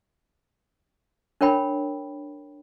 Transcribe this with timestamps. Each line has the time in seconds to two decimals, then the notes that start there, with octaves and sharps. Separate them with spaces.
1.41 D4 A#4 C#5 G5 B5